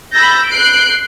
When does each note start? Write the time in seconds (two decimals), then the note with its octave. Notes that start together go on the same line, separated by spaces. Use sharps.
0.12 B5 E6 G6 A6 A#6
0.47 F#6 G6 C7 D7